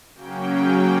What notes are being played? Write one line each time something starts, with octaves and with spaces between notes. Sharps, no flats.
C#3 F#3 A#3 C#4 G5